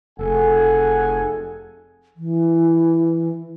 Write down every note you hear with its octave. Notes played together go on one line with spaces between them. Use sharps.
F1 G#4 A4 F#5 G#5
E3